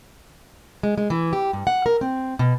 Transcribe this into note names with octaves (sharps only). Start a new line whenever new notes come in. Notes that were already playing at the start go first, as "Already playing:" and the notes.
G#3
G#3
E3
G4
G2
F#5
A#4
C4
B2